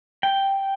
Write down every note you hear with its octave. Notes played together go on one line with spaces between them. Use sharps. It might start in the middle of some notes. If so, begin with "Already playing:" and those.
G5